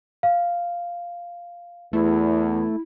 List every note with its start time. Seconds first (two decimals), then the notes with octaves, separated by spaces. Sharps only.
0.23 F5
1.93 E2 A3 E4